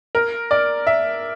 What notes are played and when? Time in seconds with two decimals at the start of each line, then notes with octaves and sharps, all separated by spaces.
0.15 A#4
0.51 D5
0.87 E5